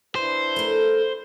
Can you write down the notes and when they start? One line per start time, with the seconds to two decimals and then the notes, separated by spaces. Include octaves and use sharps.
0.16 D4 E4 B4 C5
0.56 A3 A#4